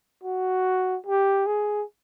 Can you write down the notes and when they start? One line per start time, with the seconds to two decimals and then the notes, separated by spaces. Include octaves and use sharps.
0.24 F#4
1.06 G4
1.47 G#4